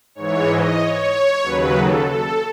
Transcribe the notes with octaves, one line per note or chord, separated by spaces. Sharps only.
G#2 E3 C#5
D#5
C#5
D#2 C#3 F#3 B4
A4
A4